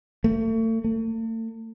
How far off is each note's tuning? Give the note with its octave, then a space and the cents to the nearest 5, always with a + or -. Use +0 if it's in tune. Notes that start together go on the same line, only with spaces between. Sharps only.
A3 +35
A3 +40